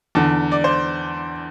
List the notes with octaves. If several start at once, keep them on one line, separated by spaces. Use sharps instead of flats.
E2 D3 A5
D5
C5